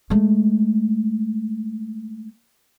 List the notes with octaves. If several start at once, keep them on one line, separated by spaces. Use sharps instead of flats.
G#3 A3